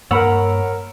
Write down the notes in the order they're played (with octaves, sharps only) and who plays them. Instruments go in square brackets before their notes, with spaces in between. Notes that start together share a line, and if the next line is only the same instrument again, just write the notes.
[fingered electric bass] G2 A#3 [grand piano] A#4 B5 E6 [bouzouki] C#5 F#5